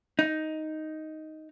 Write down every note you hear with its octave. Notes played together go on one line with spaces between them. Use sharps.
D#4